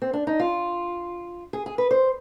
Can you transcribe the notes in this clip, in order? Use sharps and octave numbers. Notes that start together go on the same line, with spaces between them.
C4
D4
D#4
F4
G#4
G#4
B4
C5